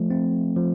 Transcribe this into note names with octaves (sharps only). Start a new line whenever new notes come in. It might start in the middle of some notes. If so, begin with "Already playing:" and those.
Already playing: F3 A3
C4
F3